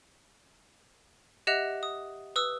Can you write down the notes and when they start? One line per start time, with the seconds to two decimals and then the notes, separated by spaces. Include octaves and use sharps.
1.47 G4 D#5 E5 F#5 F#6 F7
1.83 D#6
2.36 B4 D#6 E6